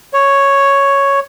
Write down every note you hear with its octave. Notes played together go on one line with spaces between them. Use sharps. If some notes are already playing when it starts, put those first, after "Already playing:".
C#5